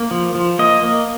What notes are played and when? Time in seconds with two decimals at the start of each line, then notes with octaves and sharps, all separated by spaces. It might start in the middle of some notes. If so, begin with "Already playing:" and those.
Already playing: A#3
0.11 F3
0.35 F3
0.59 A#3 D#5
0.83 A#3